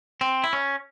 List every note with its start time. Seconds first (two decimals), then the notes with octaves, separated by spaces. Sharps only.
0.21 C4
0.44 E4
0.53 C#4